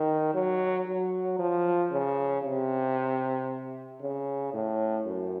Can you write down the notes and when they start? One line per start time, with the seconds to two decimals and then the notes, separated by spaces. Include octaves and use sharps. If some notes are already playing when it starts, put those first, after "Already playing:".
Already playing: D#3
0.34 F#3
0.87 F#3
1.39 F3
1.92 C#3
2.44 C3
4.02 C#3
4.54 A2
5.06 F#2